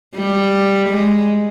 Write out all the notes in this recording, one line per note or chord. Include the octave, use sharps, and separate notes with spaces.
G3
G#3